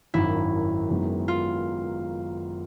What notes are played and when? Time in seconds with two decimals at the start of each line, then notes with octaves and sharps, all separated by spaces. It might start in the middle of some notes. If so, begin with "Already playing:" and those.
0.14 G#1 F#2 D#3 E4
0.90 F#1 F#2 D#3 G#3 B3
1.28 F4